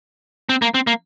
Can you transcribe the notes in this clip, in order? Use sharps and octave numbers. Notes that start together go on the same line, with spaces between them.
C4
A#3
C4
A#3